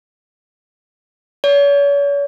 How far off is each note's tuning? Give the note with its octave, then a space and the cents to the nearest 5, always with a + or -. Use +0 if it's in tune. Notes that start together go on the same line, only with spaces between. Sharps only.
C#5 +40